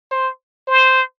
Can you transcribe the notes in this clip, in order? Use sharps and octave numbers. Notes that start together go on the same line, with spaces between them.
C5
C5